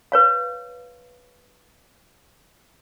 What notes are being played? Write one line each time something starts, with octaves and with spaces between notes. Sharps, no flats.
B4 C#5 F5